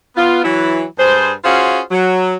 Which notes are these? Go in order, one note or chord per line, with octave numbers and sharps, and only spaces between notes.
B3 F4
E3 F#3 E4
G2 G3 G#4 C5
C#4 F4 F#4 G#4 C5 F5
F#3